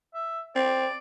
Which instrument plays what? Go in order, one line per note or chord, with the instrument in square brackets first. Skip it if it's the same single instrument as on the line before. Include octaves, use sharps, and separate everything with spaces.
[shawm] E5
[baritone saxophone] C4 [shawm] D5